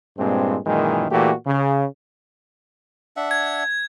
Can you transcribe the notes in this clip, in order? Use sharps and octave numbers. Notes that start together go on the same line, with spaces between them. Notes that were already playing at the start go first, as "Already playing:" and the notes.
G2 A#2 G#3 C4
F#2 A#2 D#3 E3 G#3
A#2 E3 A3 F#4 G4
C#3
D4 E5 F#5
G#6